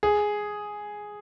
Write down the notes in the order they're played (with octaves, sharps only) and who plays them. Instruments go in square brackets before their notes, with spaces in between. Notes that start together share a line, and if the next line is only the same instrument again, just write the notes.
[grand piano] G#4